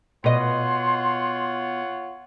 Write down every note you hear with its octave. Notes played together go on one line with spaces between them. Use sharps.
B2 F4 C#5 D#5 F#5 C6